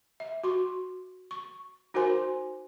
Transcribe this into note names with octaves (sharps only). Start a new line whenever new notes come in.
E5
F#4 C6 C#6
C#6
D#4 F#4 A#4 C5 G#5 C6